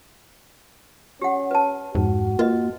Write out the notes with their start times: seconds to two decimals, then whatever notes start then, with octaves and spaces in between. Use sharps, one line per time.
1.22 C#4 G4 F#5
1.51 B4 A5
1.95 F2 G#2 F#4
2.39 A#3 F4 B4 D#5